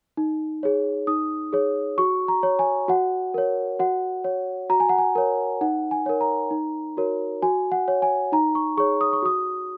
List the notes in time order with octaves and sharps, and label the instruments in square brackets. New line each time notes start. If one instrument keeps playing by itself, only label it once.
[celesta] D#4
G#4 C#5
D#4 D#6
G#4 C#5
F#4 C#6
A#5
C#5
G#5
F#4 F#5
A#4 C#5
F#4 F#5
C#5
F#4 A#5
G#5
F#5
G#5
A#4 C#5
D#4 F#5
G#5
A#4 C#5
A#5
D#4
F#4 A#4 C#5
F#4 G#5
F#5
C#5
G#5
D#4 A#5
C#6
G#4 C#5 C#6
D#6
C#6
F#4 D#6